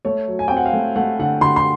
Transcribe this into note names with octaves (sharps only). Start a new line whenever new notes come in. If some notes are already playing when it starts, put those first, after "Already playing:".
A3 C#5
F#3
G#5
C4 G5
F#5
F5
A3
A3 F#5
D3 F#5
D3 C6
C6